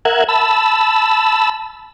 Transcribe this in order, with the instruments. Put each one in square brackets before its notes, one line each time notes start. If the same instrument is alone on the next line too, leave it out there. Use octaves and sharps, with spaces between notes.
[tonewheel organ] A#4 E5 F#5 F#6 G#6
A5 B5 E6